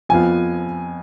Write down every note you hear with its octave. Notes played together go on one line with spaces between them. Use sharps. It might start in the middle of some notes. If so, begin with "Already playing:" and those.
F2 F3 B3 F4 G#5